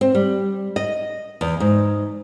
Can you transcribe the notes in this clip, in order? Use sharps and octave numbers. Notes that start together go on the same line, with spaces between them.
C4
G3
D#5
E2
G#2